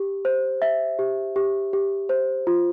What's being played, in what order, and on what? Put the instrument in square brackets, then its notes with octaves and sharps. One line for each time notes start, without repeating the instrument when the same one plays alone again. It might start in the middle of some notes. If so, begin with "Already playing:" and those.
Already playing: [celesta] G4
C5
E5
G4
G4
G4
C5
F4